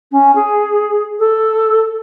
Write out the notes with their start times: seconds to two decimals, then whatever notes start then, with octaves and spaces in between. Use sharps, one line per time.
0.12 C#4
0.35 G#4
1.19 A4